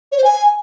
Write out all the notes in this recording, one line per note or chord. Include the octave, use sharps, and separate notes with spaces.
C#5
C5
G#5